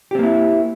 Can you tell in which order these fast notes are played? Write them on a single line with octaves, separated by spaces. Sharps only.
G4 C4 A#3 E4